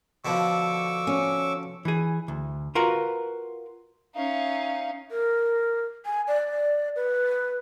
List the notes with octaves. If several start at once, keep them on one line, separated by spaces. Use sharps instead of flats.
B2 D3 F3 C#6 D6 E6
C#4
E3 G#4
D2
F4 F#4 A#4 B4
C#4 D#4 E5 F5
A#4
G#5
D5
B4